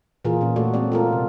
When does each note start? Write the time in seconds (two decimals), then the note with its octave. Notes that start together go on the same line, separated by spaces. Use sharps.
0.25 A#2 E3 F4 G#4 A#4
0.41 A#2 C#4
0.56 A3 F#4 A4 D5
0.74 G#3 C4 D5
0.92 F4 A4 A#4
1.13 C3